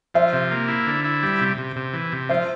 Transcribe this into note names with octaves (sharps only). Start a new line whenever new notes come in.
F3 C5 E5
C3
A#3
E4
D3
E4
G3
C3
C3
C3
E3
C3
F3 C5 E5